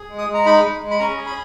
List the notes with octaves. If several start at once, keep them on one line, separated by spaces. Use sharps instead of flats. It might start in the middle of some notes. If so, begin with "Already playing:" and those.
Already playing: G#4
G#3
D#6
G#3
A#5
D#4 B5
G#3
G#3
B5
C#4 A#5
G#4
B5